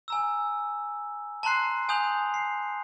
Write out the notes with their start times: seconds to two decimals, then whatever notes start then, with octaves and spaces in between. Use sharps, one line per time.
0.08 G#5 A#5 E6
1.43 A5 A#5 C6 F#6 C7
1.89 G#5 D#6 G6 F7 F#7
2.34 C7